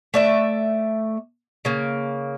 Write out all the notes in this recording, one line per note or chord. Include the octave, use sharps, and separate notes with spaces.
A3 D5 E5
C#3 A#3